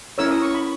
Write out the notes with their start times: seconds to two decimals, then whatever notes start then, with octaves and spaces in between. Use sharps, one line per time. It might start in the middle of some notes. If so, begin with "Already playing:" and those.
0.18 C#4 E4 A#4 C#5 E6
0.31 D#6
0.42 C#6
0.54 B5